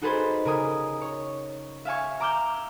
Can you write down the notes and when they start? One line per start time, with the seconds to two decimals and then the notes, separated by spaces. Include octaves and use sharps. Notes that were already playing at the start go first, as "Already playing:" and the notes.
0.02 D#4 F#4 G#4 A4 B4 C5
0.45 C#3 A#4 G#5 D#6
1.01 C#5
1.85 E5 F5 G#5 C#6
2.20 A#5 D6 E6 F6 G6